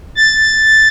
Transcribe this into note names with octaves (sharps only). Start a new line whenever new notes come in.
A6